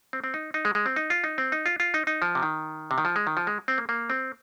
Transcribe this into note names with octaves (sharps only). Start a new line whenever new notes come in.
C4
C4
D#4
D#4
G#3
G#3
C4
D#4
F4
D#4
C4
D#4
F4
F4
D#4
D#4
F3
C3
D#3
C3
D#3
F3
G#3
D#3
F3
G#3
C4
A#3
A#3
C4